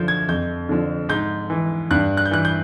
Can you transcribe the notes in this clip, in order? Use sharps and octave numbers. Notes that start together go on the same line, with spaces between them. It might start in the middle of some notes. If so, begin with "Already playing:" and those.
Already playing: F#2 D3 F3 G6
G#6
F2 G6
D3 F3
G#2 G6
E3
G2 F#6
F#6
G6
E3 F#6
G6